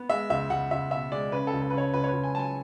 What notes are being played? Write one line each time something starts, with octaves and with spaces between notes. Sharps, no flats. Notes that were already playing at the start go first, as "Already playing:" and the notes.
Already playing: B3
G#3 E5
C#2 E5
C#2 F#5
C#2 E5
B2 E5
G#3 D5
C#3 B4
A4
C#2
A4
B4
C#3 C#5
C#2 B4
C#5
C#2 B4
G#5
F#3 G#5 A5